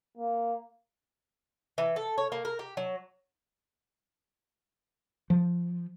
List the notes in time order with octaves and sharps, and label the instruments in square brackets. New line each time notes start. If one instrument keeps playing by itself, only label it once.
[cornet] A#3
[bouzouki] E3
A4
C#5
A#3
A#4
G4
F#3
[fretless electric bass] F3